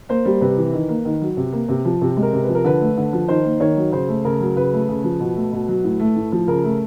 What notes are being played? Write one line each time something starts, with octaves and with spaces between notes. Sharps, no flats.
A#3 C5
G3
C3 B4
E3
D#3
A#3
D#3
F#3
C3
A#3
C3
F3
C3
G#3
A#4
C3
F3 B4
A#4
D3 B4
A3
D3
F3
D#3 C5
A#3
D#3 C#5
F#3
C#3 C5
A3
C#3 A#4
F#3
C#3 B4
A3
C#3
F3
B2
A3
B2
F#3
A2
A3
A2
F3
C#3 A#4
A3